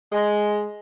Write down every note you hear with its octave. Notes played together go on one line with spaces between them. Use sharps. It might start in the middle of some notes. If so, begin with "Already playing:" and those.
G#3